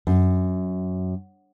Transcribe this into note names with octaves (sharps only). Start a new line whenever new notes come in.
F#2